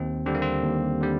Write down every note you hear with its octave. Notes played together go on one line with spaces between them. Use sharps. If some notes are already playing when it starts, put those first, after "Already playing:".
Already playing: D#2 C4
D3 G3 C4
A#3
C4
D#2
D3 G3